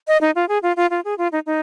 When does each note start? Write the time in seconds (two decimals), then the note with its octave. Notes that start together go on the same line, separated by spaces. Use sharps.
0.08 D#5
0.21 D#4
0.36 F4
0.49 G#4
0.63 F4
0.77 F4
0.91 F4
1.05 G#4
1.18 F4
1.32 D#4
1.46 D#4